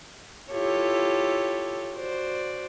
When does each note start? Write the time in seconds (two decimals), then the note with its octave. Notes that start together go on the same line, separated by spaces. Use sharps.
0.52 E4 F4 G4 A4 C#5
1.95 F#4 C5 D5